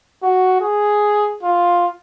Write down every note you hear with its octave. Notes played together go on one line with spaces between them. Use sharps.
F#4
G#4
F4